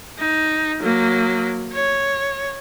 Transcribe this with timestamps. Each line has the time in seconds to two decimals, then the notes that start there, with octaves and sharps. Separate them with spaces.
0.19 D#4
0.80 F#3 A#3
1.73 C#5